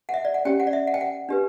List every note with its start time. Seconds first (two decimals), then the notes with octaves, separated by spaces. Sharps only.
0.09 F#5
0.14 E5
0.25 D5
0.34 F#5
0.45 C#4 G4 C#5 G5
0.60 F#5
0.67 D5
0.73 E5
0.87 F#5
0.94 G5
1.01 F#5
1.29 D4 G4 B4